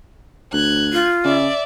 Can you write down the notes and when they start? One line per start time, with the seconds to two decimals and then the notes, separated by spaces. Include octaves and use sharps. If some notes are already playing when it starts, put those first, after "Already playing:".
0.53 D2 F#6 G#6
0.93 F4
1.25 C#3 D5 E5